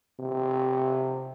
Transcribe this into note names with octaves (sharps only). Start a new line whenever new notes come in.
C3